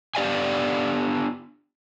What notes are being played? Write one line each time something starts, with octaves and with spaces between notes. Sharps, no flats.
B3 D4 G4 D5 F5 G#5